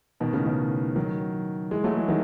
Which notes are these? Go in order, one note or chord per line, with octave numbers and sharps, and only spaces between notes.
B2 D#3
A2 C#3
B2 D#3
D#3 F#3
E3 G#3
F#3 A3
E3 G#3
D#3 F#3